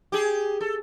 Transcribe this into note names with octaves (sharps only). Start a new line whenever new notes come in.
G4 G#4
A4